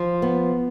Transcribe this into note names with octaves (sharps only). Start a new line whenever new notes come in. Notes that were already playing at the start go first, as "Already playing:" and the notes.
Already playing: F3
B3